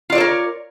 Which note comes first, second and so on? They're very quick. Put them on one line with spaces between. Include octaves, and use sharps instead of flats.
F4 D5 C#5 A4 A#4